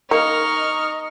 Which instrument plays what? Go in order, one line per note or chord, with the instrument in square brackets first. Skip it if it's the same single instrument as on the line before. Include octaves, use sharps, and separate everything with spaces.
[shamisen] A#3 [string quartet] D#4 F6 [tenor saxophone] D#5 [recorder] C#6